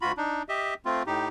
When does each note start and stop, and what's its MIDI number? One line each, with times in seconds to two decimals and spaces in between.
0.02 0.12 38
0.02 0.12 65
0.02 0.12 66
0.02 0.12 83
0.17 0.43 62
0.17 0.43 63
0.49 0.74 67
0.49 0.74 75
0.49 0.74 76
0.85 1.03 57
0.85 1.03 60
0.85 1.03 65
1.07 1.28 45
1.07 1.28 63
1.07 1.28 67